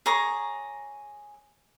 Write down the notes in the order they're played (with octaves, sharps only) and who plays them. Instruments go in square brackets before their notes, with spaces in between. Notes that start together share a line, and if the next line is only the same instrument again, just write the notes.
[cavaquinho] G#4 C#5 A#5 D6